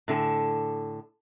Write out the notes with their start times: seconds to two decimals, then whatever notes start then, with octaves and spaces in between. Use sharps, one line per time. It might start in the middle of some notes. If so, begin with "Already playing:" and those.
0.08 A2 D3 A4 G#5